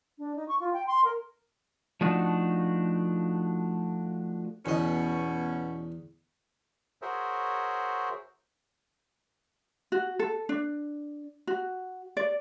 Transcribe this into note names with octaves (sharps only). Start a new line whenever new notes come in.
D4
D#4
C#6
F4
G5
C6
A#4
F3 A3 D4 D#4 F#4
E2 B2 C#4 D#5
F#4 G#4 A#4 C5 C#5 E5
F#4
A4
D4
F#4
D5